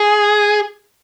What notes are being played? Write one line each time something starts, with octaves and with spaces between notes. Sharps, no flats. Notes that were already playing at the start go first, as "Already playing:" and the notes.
Already playing: G#4